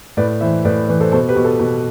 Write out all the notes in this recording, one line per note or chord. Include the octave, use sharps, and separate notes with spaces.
A2 B4 D5
E3 C5 E5
A2 B4 D5
E3 B4 D5
A4 C5
B2 A4 C5
G4 B4
B2
A4
B2